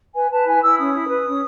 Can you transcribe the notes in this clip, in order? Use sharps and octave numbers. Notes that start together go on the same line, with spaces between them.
B4 G#5
B4 A5
E4 G#5
E4 E6
C#4 D#6
E4
B4
C#4